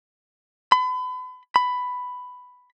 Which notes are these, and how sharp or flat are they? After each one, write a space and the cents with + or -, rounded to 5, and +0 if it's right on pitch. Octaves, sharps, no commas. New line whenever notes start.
B5 +35
B5 +10